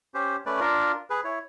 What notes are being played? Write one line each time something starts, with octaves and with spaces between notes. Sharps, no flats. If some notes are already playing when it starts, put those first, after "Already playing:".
C#4 G4 C5
A3 C#4 B4 D5
D4 F4 A#4
G#4 B4
E4 C#5